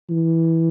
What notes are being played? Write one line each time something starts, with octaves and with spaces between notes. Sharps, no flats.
E3